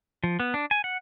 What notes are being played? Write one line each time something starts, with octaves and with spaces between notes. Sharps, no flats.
F3
B3
D4
G#5
F#5